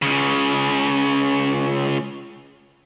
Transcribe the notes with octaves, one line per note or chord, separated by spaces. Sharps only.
C#2 C#3